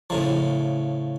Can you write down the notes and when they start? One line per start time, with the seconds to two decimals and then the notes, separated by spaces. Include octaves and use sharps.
0.10 A2 C#3 F3